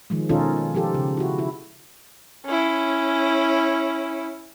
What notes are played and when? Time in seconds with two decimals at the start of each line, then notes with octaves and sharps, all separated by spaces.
0.10 D#3 F3 G#3
0.29 B2 D#3 C#4 D#4 F4 A4
0.74 F3 F4 G4 A4
0.94 C#3
1.17 E4 F#4
1.39 E4
2.46 C#4 E4